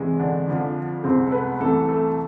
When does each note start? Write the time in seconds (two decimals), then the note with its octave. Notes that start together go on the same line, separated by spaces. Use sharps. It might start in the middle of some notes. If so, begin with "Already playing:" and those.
Already playing: E2 C3 G#3
0.20 D3 D4
0.48 F2 D3 F3
1.04 C2 C3 G#3 C4 C5
1.27 A4
1.32 B3 B4
1.60 C2 C3 E3 A3 A4
1.88 A3 A4